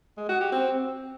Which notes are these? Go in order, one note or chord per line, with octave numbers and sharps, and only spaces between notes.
G#3
F#4
G4
C4